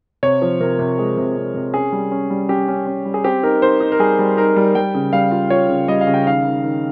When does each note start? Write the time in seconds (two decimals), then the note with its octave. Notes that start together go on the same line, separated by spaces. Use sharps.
0.23 C3 C#5
0.42 F3
0.60 C3 A#4
0.79 C3
0.98 G#3
1.17 C3
1.36 C3
1.55 C3
1.73 C#4 G#4
1.92 G3
2.11 C#4
2.30 G3
2.49 C#4 G4
2.68 C#4
2.87 C#4
3.05 G3
3.14 G#4
3.24 C4 G4
3.43 D#4 A#4
3.62 D#4 C5
3.80 D#4
3.92 A#4
3.99 G3 G#4
4.19 G3
4.37 D#4 A#4
4.56 G3
4.75 G3 G5
4.94 C#3
5.13 G3 F5
5.31 F4
5.50 F4 C#5
5.69 C#3
5.88 G3 D#5
6.01 F5
6.07 C#3
6.14 G5
6.26 D#3 F5
6.45 D#3
6.64 D#3